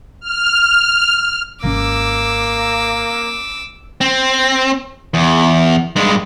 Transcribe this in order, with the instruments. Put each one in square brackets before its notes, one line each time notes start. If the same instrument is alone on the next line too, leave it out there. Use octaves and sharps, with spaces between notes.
[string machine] F6
[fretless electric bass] G#1 D#3 C#4 [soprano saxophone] A#3 [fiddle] D6 E6
[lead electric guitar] C4
E2
G2 G#3